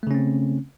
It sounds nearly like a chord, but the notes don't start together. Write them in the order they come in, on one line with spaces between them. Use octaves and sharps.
A3 C#3 C#4 C4